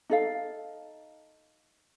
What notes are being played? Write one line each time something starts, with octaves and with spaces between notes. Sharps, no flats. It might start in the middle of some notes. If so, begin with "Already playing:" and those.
D#4 A4 F5